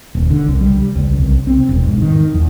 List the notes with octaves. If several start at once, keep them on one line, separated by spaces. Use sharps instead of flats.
D#1
D3
C2
G3
C#2
C2
C4
E1
G#2
D#3
E2